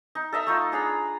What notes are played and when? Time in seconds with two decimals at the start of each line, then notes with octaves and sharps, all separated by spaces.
0.15 D#4
0.32 A4 D#5 E5 A#5
0.47 A3 D#4 F4
0.72 D4 G#4 A#5 B5